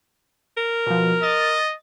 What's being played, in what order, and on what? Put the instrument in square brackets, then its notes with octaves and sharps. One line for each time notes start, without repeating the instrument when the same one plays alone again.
[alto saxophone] A#4
[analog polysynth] B2 F3
[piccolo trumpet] D#5 [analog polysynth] A6